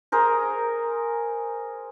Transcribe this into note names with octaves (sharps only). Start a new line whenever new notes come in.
G#4 A#4 C5